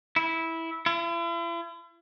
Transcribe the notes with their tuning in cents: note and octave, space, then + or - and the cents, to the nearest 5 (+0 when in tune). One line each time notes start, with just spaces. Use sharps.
E4 -10
E4 +45